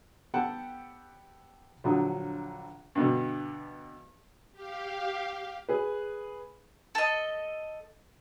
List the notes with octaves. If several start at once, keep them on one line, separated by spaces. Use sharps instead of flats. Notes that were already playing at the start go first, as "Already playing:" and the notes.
B3 G4 A4 F#5 G5 A5
A#1 D3 F#3 D#6
G2 B2 D3
G4 F5
G#4 B4
A4 D#5